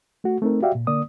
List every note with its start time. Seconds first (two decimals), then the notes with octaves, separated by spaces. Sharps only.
0.24 A3 F#4
0.42 A3 C4 D#4 A#4
0.62 F#4 G4 D5 E5 F5 G5
0.75 A#2
0.87 D3 A#3 D5 D#6